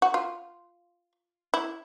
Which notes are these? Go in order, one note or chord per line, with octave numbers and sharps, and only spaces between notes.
F#4
F4
E4